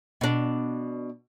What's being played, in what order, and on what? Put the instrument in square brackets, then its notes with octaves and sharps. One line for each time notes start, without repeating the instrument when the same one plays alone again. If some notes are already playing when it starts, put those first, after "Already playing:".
[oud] B2 D4